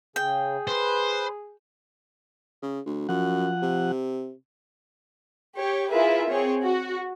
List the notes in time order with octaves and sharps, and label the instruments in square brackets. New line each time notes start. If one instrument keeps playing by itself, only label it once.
[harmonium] C#3 [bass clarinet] G#4 [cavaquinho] G5
[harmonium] B4 [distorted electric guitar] C5
[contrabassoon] C#3
D2
[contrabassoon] F#2 [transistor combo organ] F3 F#5
[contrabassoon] C3
[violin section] G4 C#5
E4 F4 G#4 A#4 B4 E5
C4 G#4 C#5
F#4